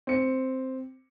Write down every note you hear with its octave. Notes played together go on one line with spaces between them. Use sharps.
C4 C#7